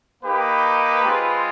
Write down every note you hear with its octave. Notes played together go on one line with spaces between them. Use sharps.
A#3 D#4 G4 B4
G#3 C4 F4